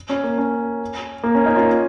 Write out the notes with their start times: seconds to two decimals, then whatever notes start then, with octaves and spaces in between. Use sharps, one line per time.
0.09 C#4
0.24 A#3
0.38 C#4
1.24 A#3
1.35 C#4
1.46 A#3 D#4
1.56 C#4 F4